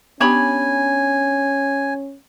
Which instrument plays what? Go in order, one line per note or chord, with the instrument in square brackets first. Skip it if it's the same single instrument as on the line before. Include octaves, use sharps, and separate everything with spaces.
[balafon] B3 G4 [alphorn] C#4 [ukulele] D4 C#5 B5 [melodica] G#5